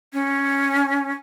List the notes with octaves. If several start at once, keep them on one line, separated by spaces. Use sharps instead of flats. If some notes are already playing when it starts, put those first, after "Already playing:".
C#4